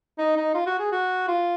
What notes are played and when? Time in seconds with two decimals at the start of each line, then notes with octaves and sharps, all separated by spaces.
0.18 D#4
0.37 D#4
0.54 F4
0.67 F#4
0.79 G#4
0.92 F#4
1.28 F4